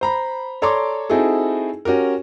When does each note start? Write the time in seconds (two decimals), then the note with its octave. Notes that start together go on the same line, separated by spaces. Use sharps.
0.01 C5 A#5 B5
0.62 A4 C#5 D5 A#5 C6 D6
1.09 C4 D#4 E4 F#4 G#4 A4
1.85 C#4 F#4 G4 A#4